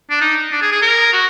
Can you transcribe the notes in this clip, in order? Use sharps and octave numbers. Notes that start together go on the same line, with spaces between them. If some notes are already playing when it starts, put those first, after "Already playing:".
D4
D#4
D4
G#4
G#4
A#4
F#4